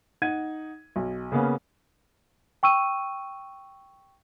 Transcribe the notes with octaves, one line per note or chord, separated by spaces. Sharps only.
D#4 F#5 G#6 D#7
B1
C#3 A#3 B3 C#4
G5 C#6 E6 D#7